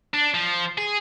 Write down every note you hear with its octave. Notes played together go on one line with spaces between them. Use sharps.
D4
F3
G#4